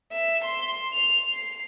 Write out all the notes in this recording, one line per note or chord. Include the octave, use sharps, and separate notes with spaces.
E5
C6
F7
C7